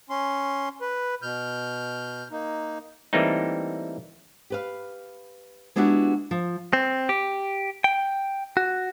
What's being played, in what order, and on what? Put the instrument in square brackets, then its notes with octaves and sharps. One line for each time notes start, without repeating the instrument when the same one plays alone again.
[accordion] C#4 C6
B4
B2 F6 G6
A#3 D#4
[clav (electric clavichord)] E3 G3 A3 A#3 C4 D#4
[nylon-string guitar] G4 B4 F5
G#3 B3 D4 E4 F#4 G4
F3
[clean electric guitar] C4
G4
G5
F#4